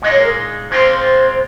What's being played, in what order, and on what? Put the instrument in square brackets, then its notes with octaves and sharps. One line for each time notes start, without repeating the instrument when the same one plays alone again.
[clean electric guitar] A#2 G#3 D#4 [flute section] D#5
[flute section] C#5
A#4
[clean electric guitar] A#2 G#3 C4 F4 [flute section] C5